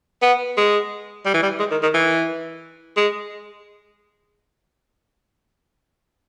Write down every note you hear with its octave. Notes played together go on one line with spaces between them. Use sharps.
B3
G#3
G3
E3
G3
G#3
D#3
D#3
E3
G#3